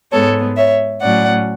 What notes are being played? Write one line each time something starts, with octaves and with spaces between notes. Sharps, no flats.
G#2 G#3 B3 A4 C#5
C#5 E5
A2 F#3 C#4 D5 F#5